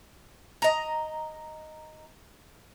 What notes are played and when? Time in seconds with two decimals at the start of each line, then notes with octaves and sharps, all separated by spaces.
0.62 D#5 A#5